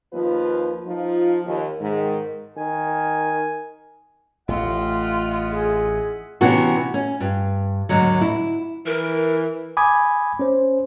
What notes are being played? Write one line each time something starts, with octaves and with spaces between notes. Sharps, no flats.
D#2 F3 F4 B4
F3 D#4 F4
D#2
G#2 D#3
D#3 G#5
A1 A3 F4 D#5 E5 F#5
G#4
C3 E3 B3 C#4 D4 F#4
C#4
G2
D#2 G#2 D3 F#3
E4
E3 A#4
G#5 B5 D6 D#6 G#6
C#4 C5